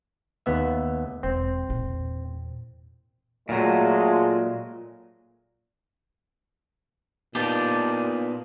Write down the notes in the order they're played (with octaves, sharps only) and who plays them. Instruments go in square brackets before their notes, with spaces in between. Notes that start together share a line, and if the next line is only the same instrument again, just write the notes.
[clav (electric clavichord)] D#2 B3 E5
[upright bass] E1 [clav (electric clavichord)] C4
[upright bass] E2 A#2
[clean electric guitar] A#2 F#3 [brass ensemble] G#3 A3 [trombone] F4
[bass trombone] A#2 [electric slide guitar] B3 D4 D#4 [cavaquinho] G4 A5 D6